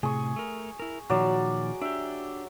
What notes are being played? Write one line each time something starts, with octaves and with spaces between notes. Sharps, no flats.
A2 C3 G#4 C#6
A3 A#4
E4 A#4
A#2 D#3 F3 F#3 D5
D4 G4 E5